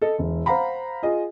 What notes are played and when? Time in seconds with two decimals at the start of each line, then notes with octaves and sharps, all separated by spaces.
0.02 A4 D#5
0.18 E1
0.46 C5 F5 F#5 A#5 B5
1.03 F4 G#4 D#5